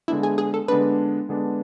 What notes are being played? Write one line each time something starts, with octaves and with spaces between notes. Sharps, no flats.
D3 G#3 B3 D4 E4
G#4
G#4
A4
D3 G#3 B3 D4 B4
D3 G#3 B3 D4